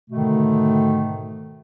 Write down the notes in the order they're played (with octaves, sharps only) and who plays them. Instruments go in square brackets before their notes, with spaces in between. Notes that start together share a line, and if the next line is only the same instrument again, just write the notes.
[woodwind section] G#2 B2 D3 D#3 A3